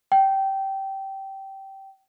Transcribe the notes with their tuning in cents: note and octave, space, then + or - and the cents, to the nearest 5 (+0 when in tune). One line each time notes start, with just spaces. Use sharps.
G5 -15